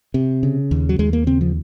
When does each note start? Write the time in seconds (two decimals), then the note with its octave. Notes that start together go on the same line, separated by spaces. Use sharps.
0.14 C3
0.43 C#3
0.71 D#2
0.89 F#3
0.99 D#2 G#3
1.13 A#3
1.27 C#3 C4
1.41 F3